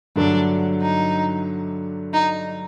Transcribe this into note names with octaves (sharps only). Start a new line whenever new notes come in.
G2 D3 F#3 A3 D4
D#4
D#4